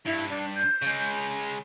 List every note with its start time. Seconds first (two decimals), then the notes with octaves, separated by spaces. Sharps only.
0.05 G2 E4
0.29 D4
0.55 G6
0.82 C#3 G#3